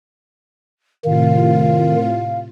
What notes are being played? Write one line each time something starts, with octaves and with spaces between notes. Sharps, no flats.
A2 C3 D#3 F4 F5